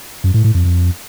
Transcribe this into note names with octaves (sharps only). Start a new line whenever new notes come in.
F#2
A2
A2
F2
F2